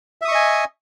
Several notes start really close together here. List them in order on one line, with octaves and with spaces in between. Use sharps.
E5 D#6 C#6 D#5 G#5